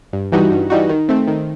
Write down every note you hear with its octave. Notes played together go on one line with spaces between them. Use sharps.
G2
E3 G3 D#4 F#4
G2
E3 G3 D#4 F#4
D#3
A3 C4
D#3